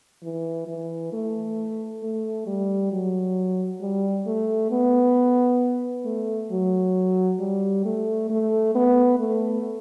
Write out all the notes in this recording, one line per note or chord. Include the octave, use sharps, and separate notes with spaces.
E3
E3
A3
A3
G3
F#3
G3
A3
B3
A3
F#3
G3
A3
A3
B3
A3